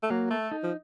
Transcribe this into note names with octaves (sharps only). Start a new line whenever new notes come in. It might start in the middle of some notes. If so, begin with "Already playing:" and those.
A3
F#3 A#3
A3 A4
D#4
F3